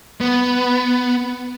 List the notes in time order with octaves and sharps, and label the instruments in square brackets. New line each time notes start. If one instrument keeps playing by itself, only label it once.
[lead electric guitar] B3